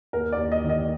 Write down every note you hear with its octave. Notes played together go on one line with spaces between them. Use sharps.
D#2 A#4
D5
D#2
D#5
D#3
D#5